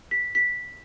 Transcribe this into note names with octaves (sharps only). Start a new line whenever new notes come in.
B6
B6